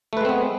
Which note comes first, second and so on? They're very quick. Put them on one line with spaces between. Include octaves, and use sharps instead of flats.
A3 B4 G#3 C4 B3